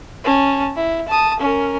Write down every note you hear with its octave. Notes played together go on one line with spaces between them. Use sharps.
C#4 A5
E4
A5 D#6
C#4 A#4